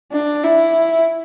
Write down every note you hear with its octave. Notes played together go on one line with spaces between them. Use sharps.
D4
E4